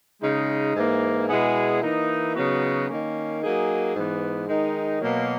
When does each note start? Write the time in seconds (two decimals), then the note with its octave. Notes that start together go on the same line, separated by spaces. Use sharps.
0.22 C#3 G#3 D#4
0.75 G#2 E3 A#3
1.28 B2 G#3 B3 E4 G#4
1.81 E3 A#3 D#4
2.35 C#3 F#3 B3 D#4 F#4
2.88 D#3 A#3 C#4
3.42 F#3 A#3 D#4 G#4
3.95 G#2 E3 B3
4.48 D#3 G#3 D#4
5.01 B2 F#3 A#3